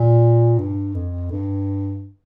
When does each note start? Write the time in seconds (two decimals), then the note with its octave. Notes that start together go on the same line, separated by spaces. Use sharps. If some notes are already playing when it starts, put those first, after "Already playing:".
Already playing: A#2
0.59 G2
0.95 F2
1.32 G2